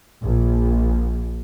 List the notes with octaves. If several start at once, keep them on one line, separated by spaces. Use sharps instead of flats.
A#1